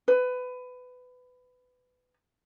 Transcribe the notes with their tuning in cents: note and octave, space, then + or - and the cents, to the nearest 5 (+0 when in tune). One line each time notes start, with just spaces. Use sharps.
B4 +20